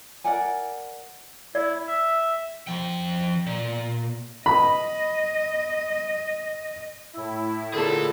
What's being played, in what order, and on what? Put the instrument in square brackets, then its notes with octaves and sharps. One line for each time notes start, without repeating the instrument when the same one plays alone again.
[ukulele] A#4 D5 F#5 G#5
[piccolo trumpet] E4 [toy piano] D5
[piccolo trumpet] E5
[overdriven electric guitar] F3 G5
A#2
[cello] D#5 [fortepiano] B5
[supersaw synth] A2 E4
[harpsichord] A#2 D3 [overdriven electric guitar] G#4 A5